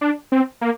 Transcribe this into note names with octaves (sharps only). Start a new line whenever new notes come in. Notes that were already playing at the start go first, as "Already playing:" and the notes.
D4
C4
A#3